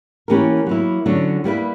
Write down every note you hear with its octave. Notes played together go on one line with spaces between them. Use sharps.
E3 A#3 C#4 G4 A#4
F#3 A#3 E4
D3 F#3 C#4 F#4
G3 A#3 E4 B4